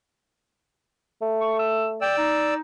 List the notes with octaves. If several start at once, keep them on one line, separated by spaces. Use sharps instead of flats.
A3
C#6
E6
D5 G5 E6
D#4